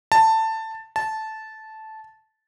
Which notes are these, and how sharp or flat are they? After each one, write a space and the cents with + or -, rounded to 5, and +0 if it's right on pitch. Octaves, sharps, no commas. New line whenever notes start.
A5 +15
A5 -10